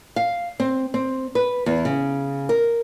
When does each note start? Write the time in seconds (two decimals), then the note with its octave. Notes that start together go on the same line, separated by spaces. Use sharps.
0.16 F5
0.60 C4
0.94 C4
1.35 B4
1.66 E2
1.85 C#3
2.49 A#4